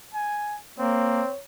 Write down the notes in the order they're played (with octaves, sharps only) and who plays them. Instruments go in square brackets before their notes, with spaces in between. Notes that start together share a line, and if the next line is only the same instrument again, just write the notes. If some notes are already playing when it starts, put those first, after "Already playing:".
[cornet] G#5
[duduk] A#3 [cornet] C4 [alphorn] C#5